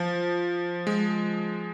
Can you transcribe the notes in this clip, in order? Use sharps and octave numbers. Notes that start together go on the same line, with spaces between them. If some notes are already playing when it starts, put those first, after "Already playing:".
Already playing: F3
G#3